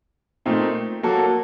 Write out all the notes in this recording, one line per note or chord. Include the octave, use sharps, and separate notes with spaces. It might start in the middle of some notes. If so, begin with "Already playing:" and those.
A#2 A3 C4 D#4
F#3 A#3 F#4 A4